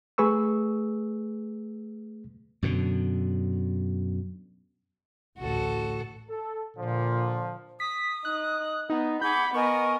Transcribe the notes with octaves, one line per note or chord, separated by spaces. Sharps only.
A3 G#4 B4 C#6 E6
F#2 B2 D3
A1 D2 A2 F#4 A4
A4
A#2 D3 F3
D#6 B6
D#4 F#6
B3 D#4
G#4 F#5 B5 D6 G6
B3 A#4 D#5 G#5 C#6